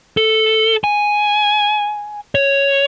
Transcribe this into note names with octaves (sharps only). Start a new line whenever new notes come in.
A4
G#5
C#5